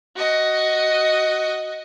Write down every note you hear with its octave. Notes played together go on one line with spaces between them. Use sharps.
F#4 D#5